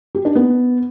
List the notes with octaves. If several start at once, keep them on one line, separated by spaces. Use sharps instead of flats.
G4
D4
B3